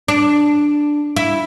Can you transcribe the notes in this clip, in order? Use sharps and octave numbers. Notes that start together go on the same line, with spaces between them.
D4
E4